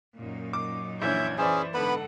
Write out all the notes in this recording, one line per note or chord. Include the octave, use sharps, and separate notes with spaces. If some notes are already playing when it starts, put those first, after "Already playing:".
F#2 A#2 D#4
D6
A#1 E3 C#4 E5 G6 G#6
E3 C#4 G#4 B4 C5 D5 E5
G#2 D3 B3 D#4 A4 B4 F#5 B5